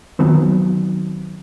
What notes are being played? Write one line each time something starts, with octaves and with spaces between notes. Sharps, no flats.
D#3 F#3 B3 C4